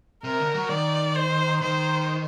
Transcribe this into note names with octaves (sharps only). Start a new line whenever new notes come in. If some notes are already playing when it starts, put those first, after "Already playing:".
C3 A#4
D3
F#3
D#3 D5
C5
D#3 C5